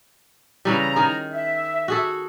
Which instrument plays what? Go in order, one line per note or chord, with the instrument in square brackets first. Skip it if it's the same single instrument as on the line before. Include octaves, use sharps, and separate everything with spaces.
[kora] C#3 E3 G3 [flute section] A#5
[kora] D#3 G#4
[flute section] E5
[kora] F#4 G#4 A4